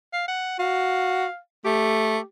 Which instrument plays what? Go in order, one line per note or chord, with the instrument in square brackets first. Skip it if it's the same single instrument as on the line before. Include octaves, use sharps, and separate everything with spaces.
[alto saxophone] F5
F#5
[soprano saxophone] F#4 [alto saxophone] F5
[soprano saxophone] A3 [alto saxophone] G4